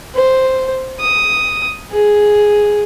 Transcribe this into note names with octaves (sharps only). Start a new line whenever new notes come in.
C5
D#6
G#4